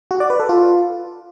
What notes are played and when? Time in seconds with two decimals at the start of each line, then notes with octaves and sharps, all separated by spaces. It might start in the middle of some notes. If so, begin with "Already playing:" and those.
0.11 F#4
0.20 D5
0.30 B4
0.40 A4
0.49 F4